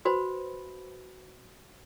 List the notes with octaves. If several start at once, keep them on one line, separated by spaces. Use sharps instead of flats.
F#4 B4 C5 B5